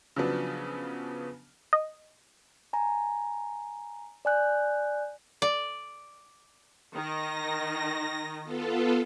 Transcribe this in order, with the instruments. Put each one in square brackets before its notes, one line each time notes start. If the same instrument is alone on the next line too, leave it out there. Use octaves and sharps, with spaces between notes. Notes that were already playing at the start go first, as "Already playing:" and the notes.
[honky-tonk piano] C#3 F3 F#3 B3 D4
[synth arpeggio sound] D#5
[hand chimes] G#5 A#5
D5 G#5 F#6 G6
[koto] D5
[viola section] D#3 [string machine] A#6
[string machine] B3 F4 A4